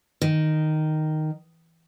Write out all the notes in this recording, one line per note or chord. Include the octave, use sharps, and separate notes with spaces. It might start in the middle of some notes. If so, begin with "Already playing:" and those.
D#3